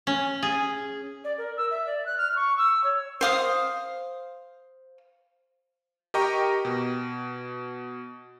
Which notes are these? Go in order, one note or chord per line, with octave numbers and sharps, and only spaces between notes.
C#4
G#4
D5
A#4
E6
E5
D5
F#6
F6
C#6
E6
C#5
C5 F5 D#6
G4 A#4 D#5 G5 A#5 C#6
B2